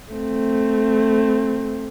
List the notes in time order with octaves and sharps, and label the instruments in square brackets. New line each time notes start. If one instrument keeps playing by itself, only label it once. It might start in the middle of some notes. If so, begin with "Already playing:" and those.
[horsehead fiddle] A3 C4